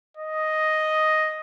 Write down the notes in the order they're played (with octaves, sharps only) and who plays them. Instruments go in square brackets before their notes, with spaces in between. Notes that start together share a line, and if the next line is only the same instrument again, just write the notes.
[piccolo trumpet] D#5